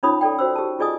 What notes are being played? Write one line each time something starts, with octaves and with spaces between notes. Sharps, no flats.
C#4 D#4 F4 C#5 B5 D#6
A4 D5 G5
F#4 C5 E6
G4 A5
F4 G#4 D5 D#5 G#5 D#6